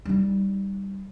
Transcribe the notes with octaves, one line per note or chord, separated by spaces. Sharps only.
G3 D#4